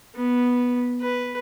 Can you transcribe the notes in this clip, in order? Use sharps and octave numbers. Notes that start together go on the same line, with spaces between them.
B3
B4